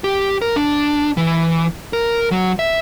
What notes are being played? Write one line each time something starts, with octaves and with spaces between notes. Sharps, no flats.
G4
A#4
D4
E3
A#4
F#3
E5